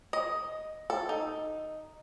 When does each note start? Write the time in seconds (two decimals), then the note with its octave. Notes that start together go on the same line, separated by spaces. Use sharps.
0.13 D#5
0.90 A4
1.09 D#4